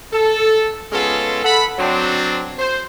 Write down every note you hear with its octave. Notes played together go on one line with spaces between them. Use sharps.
A4
G#3 B3 C#4 F4 G#4 A4
A4 F#5 B5
F#3 C4 D4
C5